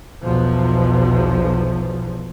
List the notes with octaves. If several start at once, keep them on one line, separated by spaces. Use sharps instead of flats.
B1 E2 B2 F3